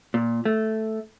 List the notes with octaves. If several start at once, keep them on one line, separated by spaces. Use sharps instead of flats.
A#2
A3